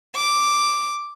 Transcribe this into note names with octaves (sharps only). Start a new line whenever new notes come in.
D6